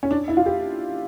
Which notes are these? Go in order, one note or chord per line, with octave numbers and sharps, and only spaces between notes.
C#4
D4
E4
F4
G4